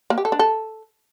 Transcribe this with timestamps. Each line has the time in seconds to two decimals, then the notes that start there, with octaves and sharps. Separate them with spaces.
0.10 A#3
0.18 G4
0.25 A4
0.32 D4
0.39 A4